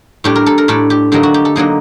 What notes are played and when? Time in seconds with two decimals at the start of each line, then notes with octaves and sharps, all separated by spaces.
0.24 A2 G3 D4 G4
0.35 A#4
0.46 A4
0.58 A#4
0.68 A2 G3 D4 A4
0.90 G4
1.12 D3 F#3 A#3 D#4 G4
1.23 F#4
1.34 G4
1.45 A4
1.56 D3 F#3 A#3 D#4